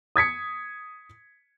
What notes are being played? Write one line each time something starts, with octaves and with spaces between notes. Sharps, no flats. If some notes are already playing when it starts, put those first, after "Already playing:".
D#6 G#6 B6 C#7